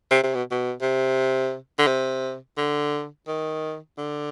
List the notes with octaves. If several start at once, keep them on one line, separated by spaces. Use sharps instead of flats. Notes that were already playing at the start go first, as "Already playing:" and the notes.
C3
C3
B2
B2
C3
D3
C3
D3
D#3
D3